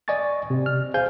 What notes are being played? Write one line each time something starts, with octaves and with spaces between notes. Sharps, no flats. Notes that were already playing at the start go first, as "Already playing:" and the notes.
D5 D#5 G#5 C#6 A6
C3
F6
G#4 C5 F5 G#5 G6